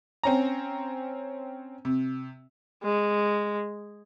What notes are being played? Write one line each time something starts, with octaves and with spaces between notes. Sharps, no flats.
C4 C#4 A#5
C3
G#3